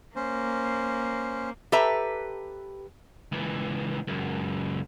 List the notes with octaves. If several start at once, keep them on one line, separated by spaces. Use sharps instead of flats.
A#3 C#4 C5
G4 A4 B4 E5 A#5
C#2 E3
C#2 F#2